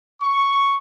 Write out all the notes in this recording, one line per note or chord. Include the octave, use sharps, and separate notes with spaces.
C#6